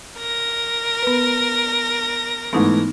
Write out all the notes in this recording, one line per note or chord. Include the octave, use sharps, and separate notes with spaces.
A#4 A#6
B3 B4
G#2 E3 A3 B3 D#4